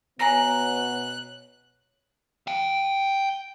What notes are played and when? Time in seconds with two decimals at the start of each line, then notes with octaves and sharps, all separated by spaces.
0.19 B2 B3 C#5 G#5 A#5 F#6 A#6
2.47 F5 G5